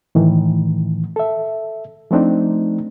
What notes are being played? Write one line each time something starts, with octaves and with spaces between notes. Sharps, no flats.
A2 D#3 E3
A4 E5
F3 A3 C4 D4 D#4